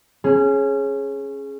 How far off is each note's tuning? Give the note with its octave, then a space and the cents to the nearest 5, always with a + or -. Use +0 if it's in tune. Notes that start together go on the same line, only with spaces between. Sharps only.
C#4 -20 G#4 +10